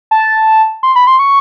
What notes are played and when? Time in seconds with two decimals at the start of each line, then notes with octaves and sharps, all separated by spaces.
0.11 A5
0.83 C6
0.96 B5
1.07 C6
1.19 C#6